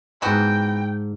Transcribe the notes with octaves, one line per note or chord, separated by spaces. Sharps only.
G#2 E3 B3 F#4 G5 A5 A#5